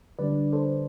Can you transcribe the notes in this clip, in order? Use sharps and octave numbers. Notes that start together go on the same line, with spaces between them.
D3 G3 D4 B4 D5
A4 C5